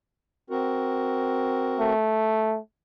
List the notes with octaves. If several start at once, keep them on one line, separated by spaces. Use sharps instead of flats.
C4 F#4 A#4
A3